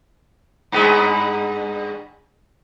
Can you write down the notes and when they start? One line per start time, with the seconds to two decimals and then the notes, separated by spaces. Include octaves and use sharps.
0.72 G2 G#3 B3